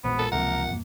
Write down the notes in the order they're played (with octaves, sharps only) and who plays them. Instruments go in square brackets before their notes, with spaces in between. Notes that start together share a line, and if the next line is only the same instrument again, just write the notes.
[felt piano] E1 C5 [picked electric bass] A#1 A#2 G#3 [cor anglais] B3
[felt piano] F4 A#4 [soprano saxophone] A4
[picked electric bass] C#2 E3 G#3 [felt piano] C3 F3 A#3 [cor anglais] A#4 [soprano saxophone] F#5
[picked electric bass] E2 G2 A#3